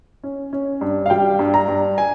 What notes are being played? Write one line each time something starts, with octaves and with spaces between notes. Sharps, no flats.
C#4
C#4
G2
F5
G3 G5
G2
A#5
G2
G#5